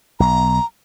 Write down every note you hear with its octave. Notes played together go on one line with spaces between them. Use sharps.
B1 A#5